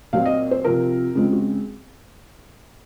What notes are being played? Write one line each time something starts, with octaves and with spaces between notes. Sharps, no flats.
A#2 F#3 C4 F5
D#5
C5
C3 F3 C4 A#4
C#3 G#3 C4 F4
F#4